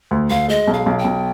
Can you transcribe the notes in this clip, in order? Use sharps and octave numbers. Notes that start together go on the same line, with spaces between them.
D2
D2 F5
G#3 D#5
B1
F5
B1
G5
B1